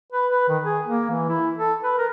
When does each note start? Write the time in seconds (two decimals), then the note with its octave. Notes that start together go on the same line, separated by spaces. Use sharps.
0.12 B4
0.31 B4
0.48 D#3
0.64 G#4
0.87 A#3
1.10 E3
1.29 E4
1.58 A4
1.83 B4
1.98 A#4